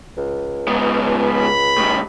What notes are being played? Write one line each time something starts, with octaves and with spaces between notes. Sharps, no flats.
C#2
G#2 B3
B5
A2 G3